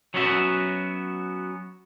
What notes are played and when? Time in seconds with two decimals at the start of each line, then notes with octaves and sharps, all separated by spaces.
0.14 F#3 B3 C#4 F#4 E5